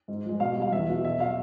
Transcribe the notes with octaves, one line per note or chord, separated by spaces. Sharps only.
G#2
F3 G#3
B2 F5
G3
F5
E2 E5
B2 F#3
B2 E5
F#3 F5